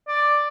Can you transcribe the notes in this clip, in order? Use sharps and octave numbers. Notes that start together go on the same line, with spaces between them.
D5